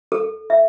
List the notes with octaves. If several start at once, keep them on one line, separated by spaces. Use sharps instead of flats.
A4
E5